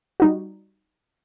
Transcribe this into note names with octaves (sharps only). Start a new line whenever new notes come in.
G3 D#4 F#4